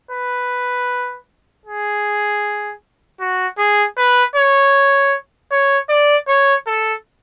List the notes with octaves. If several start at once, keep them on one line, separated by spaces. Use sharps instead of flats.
B4
G#4
F#4
G#4
B4
C#5
C#5
D5
C#5
A4